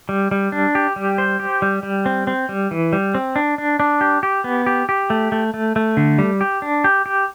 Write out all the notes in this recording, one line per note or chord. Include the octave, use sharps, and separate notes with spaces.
G3
G3
D4
G4
G3
C5
G4
G3
G3
C4
C4
G3
E3
G3
C4
D4
D4
D4
G4
G4
B3
G4
G4
A3
A3
A3
A3
D3
G3
G4
D4
G4
G4